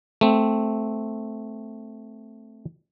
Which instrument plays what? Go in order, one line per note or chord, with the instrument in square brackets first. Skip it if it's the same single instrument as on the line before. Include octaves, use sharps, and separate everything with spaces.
[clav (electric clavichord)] A3 C4